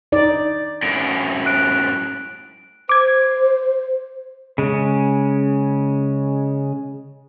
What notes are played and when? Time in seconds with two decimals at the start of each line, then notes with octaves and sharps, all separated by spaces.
0.12 D#4 D5
0.82 F#2 A2 D7
1.46 F#6 D7
2.89 C5 D6 G#6
4.58 C#3 G#3